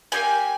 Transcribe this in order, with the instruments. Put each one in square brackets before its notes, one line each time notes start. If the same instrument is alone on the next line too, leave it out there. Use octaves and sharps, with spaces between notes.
[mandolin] A#3 D#4 G4 G#5